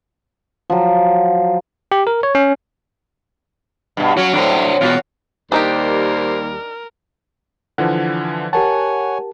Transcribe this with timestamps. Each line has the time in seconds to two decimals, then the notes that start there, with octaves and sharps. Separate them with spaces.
0.70 F3 F#3
1.92 G4
2.07 A#4
2.23 C#5
2.35 C#4
3.97 G2 B2
4.17 F#3 C#4 F#4
4.33 A2 F#3 D4 C5
4.81 E2 B2 F4 F#4
5.52 D#2 G3 D4 D#4 G4 A#4 C5
7.78 D3 E3 F3 F#5
8.53 G4 A#4 C#5 F#5 G#5 A5